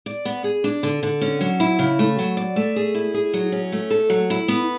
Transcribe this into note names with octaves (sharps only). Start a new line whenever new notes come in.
D5
B3
G#4
D4
D3
D3
C#4
F#3
E4
C#3
A3
F#3
D5
A3
G#4
E4
G#4
F#3
C#4
A3
A4
F#3
E4
B3